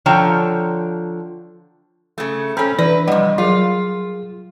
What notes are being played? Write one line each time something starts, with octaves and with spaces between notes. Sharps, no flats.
D3 F3 C#5 G5 A#5
C#3 A3
C4 C#4 A4 A#5 B5
E3 D4 B4 D5
F2 C3 G3 D#5 F#5
F#3 F4 G#4 A#4